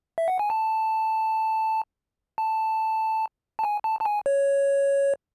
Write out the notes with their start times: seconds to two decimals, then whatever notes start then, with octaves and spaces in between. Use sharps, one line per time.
0.18 E5
0.28 F#5
0.39 G#5
0.50 A5
2.38 A5
3.59 A5
3.64 G#5
3.84 A5
4.01 A5
4.05 G#5
4.26 C#5